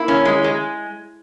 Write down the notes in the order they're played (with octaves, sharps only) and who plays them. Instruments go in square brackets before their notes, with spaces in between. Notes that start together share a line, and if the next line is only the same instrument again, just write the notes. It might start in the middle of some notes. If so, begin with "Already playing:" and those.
Already playing: [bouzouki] A#3 [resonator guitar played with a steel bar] E4
[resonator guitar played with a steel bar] C#4
G#3
G#3